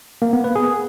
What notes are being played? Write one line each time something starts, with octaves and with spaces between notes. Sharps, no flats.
A#3
B3
B4
G#4